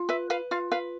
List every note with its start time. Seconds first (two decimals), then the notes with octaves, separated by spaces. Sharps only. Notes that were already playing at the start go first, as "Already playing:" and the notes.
Already playing: F4
0.09 B4 E5
0.30 B4 F5
0.51 F4 F5
0.72 B4 F5